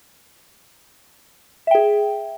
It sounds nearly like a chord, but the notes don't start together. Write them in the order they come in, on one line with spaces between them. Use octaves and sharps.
E5 G5 G#4